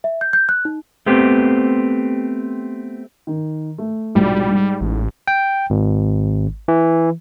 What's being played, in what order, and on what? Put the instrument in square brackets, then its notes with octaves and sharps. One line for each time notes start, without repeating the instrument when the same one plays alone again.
[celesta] E5
G6
G6
F#6
D#4
[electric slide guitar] A3 B3 C4 G4
[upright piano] D#3
A3
[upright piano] A#1 G#2 B2 [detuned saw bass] G3
[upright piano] G#2
[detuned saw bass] A1
[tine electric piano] G5
G#1
E3